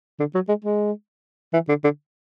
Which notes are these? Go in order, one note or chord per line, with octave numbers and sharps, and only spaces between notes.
D3
F#3
G#3
G#3
E3
D3
D3